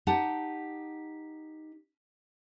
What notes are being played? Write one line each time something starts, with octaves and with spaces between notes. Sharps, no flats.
D#4 G4 F#5 A5